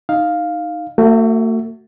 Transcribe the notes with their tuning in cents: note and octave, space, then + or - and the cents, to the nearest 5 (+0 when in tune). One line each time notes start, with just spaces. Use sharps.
D#4 +0 F5 +5
A3 +40 F#4 +0 E5 +0